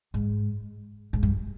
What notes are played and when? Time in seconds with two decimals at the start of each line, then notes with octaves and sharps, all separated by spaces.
0.14 G#2
1.13 G#2
1.23 G2